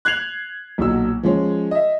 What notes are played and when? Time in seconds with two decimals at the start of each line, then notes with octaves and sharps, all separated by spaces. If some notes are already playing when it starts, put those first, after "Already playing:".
0.05 F#6 G#6 C7 F7 F#7
0.78 B1 A#2 F#3 E6
1.23 F3 G#3 C#4
1.71 D#5 E5